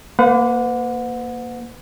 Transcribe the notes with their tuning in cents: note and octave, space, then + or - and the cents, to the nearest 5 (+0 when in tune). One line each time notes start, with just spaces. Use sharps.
A#3 +0 B4 +45 F#5 -30